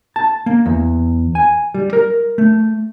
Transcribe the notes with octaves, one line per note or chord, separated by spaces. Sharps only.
A5
A#3
E2
G#5
G3
A#4
A3